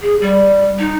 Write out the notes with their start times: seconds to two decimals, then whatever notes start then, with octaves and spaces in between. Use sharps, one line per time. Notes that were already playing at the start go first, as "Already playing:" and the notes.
0.01 G#4
0.21 G3
0.79 D#4